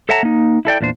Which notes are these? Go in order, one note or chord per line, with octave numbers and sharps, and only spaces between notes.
A4 C#5 E5 F#5 A5 A#5
A#3 D#4
E4 A4 D5 G5
E2 A#2 D4 C5